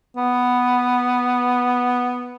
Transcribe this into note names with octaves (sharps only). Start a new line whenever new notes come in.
B3